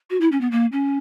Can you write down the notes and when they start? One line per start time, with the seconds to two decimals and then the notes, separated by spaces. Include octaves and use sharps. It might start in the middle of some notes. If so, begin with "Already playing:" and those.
0.10 F#4
0.21 E4
0.32 C#4
0.41 B3
0.51 A#3
0.72 C#4